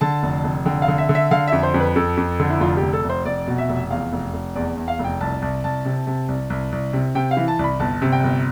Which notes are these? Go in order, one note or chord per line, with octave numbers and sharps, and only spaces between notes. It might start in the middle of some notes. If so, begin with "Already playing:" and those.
D3 A5
F1
F1
D3 G5
F5
D3
E5
D3
E5
D3 F5
F2 E5
C5
F2
B4
F2 A4
F2
D3
E4
F1 F4
G4
F1
A4
F1
C5
F1 D5
B2
E5
F1
E2 F5
F1
F1
E2 D5
E2
F5
F1
G5
C2 A5
C2 A5
C2 A5
C3
C3
C2
C2
C2
C3
C3 G5
F5
E3
A5
C2 B5
G1 A5
C3
G5
G1